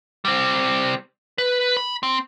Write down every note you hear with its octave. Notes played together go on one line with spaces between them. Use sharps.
G3 C4
B4
B5
C4